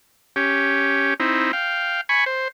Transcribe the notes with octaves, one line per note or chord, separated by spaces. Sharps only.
C#4 G4
C4 D#4 E4
F5 G5
G#5 B5 C#6
C5